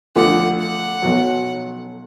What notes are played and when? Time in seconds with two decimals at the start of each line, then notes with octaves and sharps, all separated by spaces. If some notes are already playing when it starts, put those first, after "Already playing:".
0.16 D2 D3 F3 F#5
0.59 F#5
1.02 B1 B2 F#3